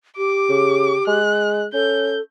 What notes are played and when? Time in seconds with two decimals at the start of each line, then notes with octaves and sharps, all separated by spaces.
0.18 G4 D6
0.49 C#3
1.07 G#3 F#6
1.74 C#4 A4 G6